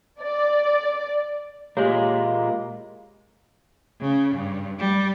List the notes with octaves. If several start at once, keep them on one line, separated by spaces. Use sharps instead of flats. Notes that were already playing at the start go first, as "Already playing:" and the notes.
D5
A#2 G#3 A#3 G4 C#5
C#3
G2
G3